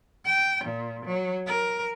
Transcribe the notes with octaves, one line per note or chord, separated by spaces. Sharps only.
G5
A#2
F#3
A#4